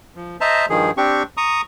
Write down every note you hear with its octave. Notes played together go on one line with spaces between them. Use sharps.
F3
C5 D#5 E5 A5 A#5
G2 D#3 F3 G#4
C4 D4 G4 C#6
A#5 C#6 D#6